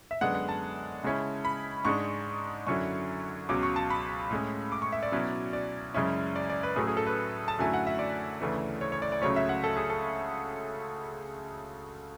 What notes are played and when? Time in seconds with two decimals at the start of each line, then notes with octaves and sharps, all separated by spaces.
0.11 E5
0.21 F#2 D3 G#3 B3 D4 F#5
0.35 F#5
0.49 A5
1.04 C#3 G#3 C#4 E4
1.45 B5
1.85 G#2 G#3 D4 C#6
2.67 F#2 D3 F#3 C#4 E4 C#6
3.49 C#2 B2 F#3 C#4 D6
3.63 C#6
3.76 A5
3.90 B5
4.31 A2 G#3 C#4
4.72 D6
4.82 C#6
4.92 E5
5.03 D5
5.12 B2 F#3 C#4 E4
5.53 D5
5.94 F#2 C#3 G#3 C#4 E4
6.36 D5
6.50 D5
6.63 B4
6.76 A2 F#3 A3 C#4 G#4
6.87 G#4
6.97 A4
7.07 B4
7.48 A5
7.59 F#2 D3 F#3 A3 E4 G#5
7.74 F#5
7.87 E5
7.99 D5
8.41 D2 C#3 E3 A3
8.81 C#5
8.92 C#5
9.02 D5
9.12 D5
9.22 C#2 C#3 F#3 A3 C#4 C#5
9.36 E5
9.49 F#5
9.64 A4
9.77 G#4
9.90 A4